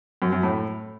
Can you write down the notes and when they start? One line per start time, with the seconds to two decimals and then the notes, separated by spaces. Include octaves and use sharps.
0.22 F#2
0.32 F#2
0.43 A2